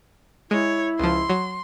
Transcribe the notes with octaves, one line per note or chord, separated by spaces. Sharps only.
G#3 E4 C#5
C#2 F3 C6
F#3